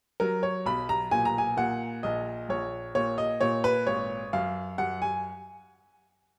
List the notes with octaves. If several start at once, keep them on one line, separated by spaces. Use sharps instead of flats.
F#3 A#4
C#5
B1 B5
A#5
A#2 G#5
A#5
G#5
A#2 F#5
A#1 D#5
A#1 C#5
A#2 C#5
D#5
A#2 C#5
B4
G#1 C#5
F#2 F5
F#2 F#5
G#5